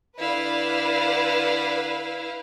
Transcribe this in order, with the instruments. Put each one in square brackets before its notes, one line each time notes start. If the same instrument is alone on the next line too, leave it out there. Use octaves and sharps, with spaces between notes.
[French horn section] D3 D5 [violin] E4 F5 [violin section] B4